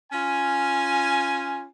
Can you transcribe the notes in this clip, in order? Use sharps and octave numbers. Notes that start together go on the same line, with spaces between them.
C#4 F4 G#5